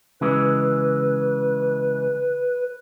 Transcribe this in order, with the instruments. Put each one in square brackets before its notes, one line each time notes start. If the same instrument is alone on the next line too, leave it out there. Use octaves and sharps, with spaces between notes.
[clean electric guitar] C#3 E3 G#3 [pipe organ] B4